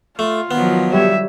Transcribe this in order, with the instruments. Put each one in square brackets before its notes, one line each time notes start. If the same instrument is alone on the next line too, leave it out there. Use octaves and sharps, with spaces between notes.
[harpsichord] A3 [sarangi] F4
[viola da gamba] D#3 F3 F#3 [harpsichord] B3
[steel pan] G3 G4 C#5 [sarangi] E5